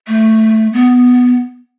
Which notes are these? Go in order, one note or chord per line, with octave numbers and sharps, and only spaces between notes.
A3
B3